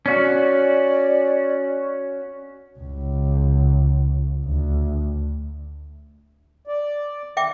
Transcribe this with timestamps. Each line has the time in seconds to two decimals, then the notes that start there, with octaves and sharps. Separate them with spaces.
0.06 C#4 F#4 D5
2.79 C#2
4.45 D2
6.67 D5
7.37 D#3 E5 G5 D6